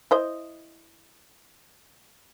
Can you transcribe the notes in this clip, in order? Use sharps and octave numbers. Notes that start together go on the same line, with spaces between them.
E4 C5 D#5